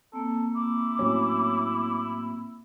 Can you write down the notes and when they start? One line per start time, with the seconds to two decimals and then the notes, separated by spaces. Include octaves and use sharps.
0.13 A#3 C4 A4
0.55 E4 D6
0.99 A2 F#3 C#4